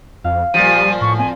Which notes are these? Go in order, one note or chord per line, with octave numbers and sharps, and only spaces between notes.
F2 F5
A#2 F3 G3 D#7
A2 C#6
C4 G#5